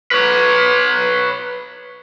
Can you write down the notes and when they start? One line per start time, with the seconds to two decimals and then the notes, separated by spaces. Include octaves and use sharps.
0.11 B4 C#5